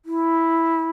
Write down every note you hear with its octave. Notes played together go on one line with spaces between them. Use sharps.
E4